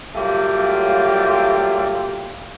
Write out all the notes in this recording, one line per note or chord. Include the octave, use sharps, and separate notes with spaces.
F#3 G3 A3 A#3 F4 G4